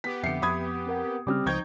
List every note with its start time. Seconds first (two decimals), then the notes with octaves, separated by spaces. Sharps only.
0.04 B3 G4 B6
0.24 F2 D3 E5 C7 C#7
0.42 F2 B5 D#6 G#6
0.87 C4 A#4 F#5
1.27 C#3 G3 C4 D6 D#6 F6
1.46 C#2 F3 D#4 C5 G5 C#6 G6 G#6